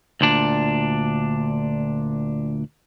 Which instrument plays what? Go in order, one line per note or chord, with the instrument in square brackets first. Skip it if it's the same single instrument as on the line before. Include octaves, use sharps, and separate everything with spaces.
[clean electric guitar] D2 A#2 D4